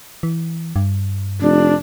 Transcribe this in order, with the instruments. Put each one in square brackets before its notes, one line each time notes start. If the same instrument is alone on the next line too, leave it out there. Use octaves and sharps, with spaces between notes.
[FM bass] E3
G2
[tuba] F1 [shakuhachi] D4